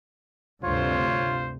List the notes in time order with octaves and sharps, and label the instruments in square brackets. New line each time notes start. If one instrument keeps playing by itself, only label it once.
[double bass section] D2 G2 C3 [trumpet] F4 [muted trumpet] C5 [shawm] C#5